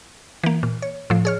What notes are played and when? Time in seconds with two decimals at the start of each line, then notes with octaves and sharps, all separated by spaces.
0.43 E3 A#3
0.63 A#2
0.82 C#5
1.10 A2 F3
1.25 G#4 C#5 F6